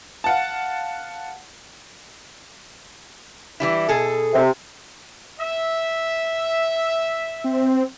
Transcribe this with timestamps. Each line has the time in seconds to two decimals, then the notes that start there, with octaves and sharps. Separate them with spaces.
0.24 F5 F#5 A5
3.60 E3 G3 E4
3.88 B2 G#4 A4
4.32 C3
5.40 E5
7.44 C4